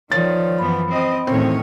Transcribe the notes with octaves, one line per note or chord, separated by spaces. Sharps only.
D#3 F3 C#5 D5 A6
F#2 E3 B3 B5
C4 D#5
E2 A2 D#3 C4 C#4 C#5